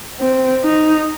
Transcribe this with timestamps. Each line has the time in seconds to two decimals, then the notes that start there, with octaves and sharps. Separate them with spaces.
0.20 C4
0.64 D#4